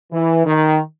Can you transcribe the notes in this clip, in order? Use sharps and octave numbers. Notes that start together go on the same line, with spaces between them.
E3
D#3